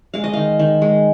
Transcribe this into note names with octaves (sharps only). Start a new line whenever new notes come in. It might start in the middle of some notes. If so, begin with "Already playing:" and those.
G#3 F5
D#5
D#3 F5
D#3
G#3